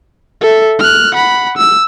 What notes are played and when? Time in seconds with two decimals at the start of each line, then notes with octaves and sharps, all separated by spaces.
0.41 A4 E5
0.79 F6 F#6
1.14 F#5 B5
1.57 E6